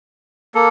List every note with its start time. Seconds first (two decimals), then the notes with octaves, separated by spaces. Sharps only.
0.55 A#3 A4